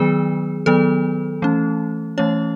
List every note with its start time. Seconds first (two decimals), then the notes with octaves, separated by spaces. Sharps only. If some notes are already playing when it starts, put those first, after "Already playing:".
Already playing: D#3 F#3 B3 G#4
0.66 D#3 F#3 B3 A4
1.42 E3 A3 C#4
2.18 E3 A3 C#4 C#5